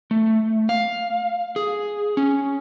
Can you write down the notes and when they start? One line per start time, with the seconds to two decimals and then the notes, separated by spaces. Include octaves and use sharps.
0.11 A3
0.69 F5
1.56 G#4
2.17 C#4